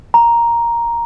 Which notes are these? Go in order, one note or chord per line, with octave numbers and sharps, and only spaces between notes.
A#5